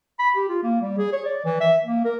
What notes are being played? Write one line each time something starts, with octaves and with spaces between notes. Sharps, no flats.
B5
G4
F4
A#3
G3
G#4
C#5
D5
E3
E5
A#3
A#4